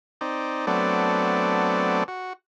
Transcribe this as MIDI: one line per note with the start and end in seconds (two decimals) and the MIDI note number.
0.21 0.66 60
0.21 0.66 63
0.21 0.66 74
0.67 2.04 54
0.67 2.04 57
0.67 2.04 59
0.67 2.04 60
0.67 2.04 62
0.67 2.04 74
2.08 2.33 66